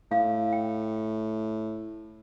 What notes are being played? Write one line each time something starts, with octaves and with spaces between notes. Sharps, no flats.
A2 F5
G5